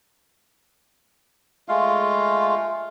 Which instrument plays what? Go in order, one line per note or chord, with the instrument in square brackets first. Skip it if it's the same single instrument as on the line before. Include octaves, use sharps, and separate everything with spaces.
[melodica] G#3 A3 F4 F5